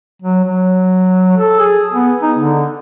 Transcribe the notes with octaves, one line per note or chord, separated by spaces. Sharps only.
F#3
F#3
A4
G#4
B3
D#4
D3